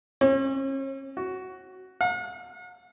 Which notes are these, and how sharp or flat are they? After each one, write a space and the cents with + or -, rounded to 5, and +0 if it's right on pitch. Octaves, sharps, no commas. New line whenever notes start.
C#4 -40
F#4 +10
F#5 -45